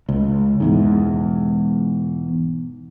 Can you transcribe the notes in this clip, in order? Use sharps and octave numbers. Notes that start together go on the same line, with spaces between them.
C#2
E1 E2 G#2